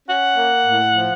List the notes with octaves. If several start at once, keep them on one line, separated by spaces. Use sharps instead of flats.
C#4 F#5
A#3
A2
F3